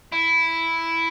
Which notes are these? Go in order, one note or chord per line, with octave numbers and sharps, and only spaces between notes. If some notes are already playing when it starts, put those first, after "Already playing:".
E4